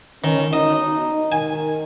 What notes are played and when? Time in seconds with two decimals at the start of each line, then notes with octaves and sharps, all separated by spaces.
0.24 D#3 C#4
0.53 D#4 D#5
1.32 D#3 G#5